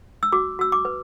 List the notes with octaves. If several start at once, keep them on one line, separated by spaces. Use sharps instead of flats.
E6
F#4 D6
F#4 E6
D6
B4